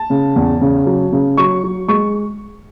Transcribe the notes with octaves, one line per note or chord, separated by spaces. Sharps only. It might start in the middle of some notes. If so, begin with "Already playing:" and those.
Already playing: A5
C#3
E2
C#3
F#3
C#3
F#3 C#6
F#3
G#3 C#6